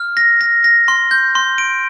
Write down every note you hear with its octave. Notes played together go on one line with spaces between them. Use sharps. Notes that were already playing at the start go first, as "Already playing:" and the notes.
Already playing: F6
A#6
A#6
A#6
C6
G6
C6
D7